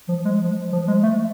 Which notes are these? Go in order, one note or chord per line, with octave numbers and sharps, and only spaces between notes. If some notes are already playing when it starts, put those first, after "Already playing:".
F3
G#3
F3
F3
G#3
A3